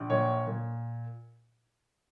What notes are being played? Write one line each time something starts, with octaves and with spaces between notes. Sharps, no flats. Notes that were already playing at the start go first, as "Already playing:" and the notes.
Already playing: A#1
A#2 C#5
A#2